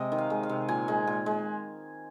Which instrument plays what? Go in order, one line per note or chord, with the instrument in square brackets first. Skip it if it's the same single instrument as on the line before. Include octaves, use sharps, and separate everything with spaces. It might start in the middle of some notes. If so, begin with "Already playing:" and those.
Already playing: [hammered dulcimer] C3 G#3 D#5
D#3
F5
G#3
F5
C3
A#2 G#5
G#3
A#2
G#3